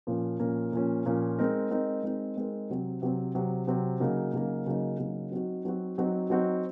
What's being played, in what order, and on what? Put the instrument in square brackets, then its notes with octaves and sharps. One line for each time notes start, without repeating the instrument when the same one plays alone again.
[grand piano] A#2 F3 A#3 C#4
A#2 F3 A#3 C#4
A#2 F3 A#3 C#4
A#2 F3 A#3 C#4
G#3 C4 D#4 A#4
G#3 C4 D#4 A#4
G#3 C4 D#4 A#4
G#3 C4 D#4 A#4
C3 F#3 C4
C3 F#3 C4
C3 F#3 C4
C3 F#3 C4
C#3 F#3 A#3 D#4
C#3 F#3 A#3 D#4
C#3 F#3 A#3 D#4
C#3 F#3 A#3 D#4
F#3 C4 D#4 F#4
F#3 C4 D#4 F#4
F#3 C4 D#4 F#4
F#3 C4 D#4 F#4